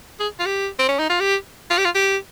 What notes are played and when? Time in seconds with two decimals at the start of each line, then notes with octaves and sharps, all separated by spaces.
0.20 G#4
0.40 F4
0.46 G4
0.79 C4
0.89 C#4
0.99 D#4
1.10 F4
1.20 G4
1.71 F4
1.78 G4
1.85 F4
1.95 G4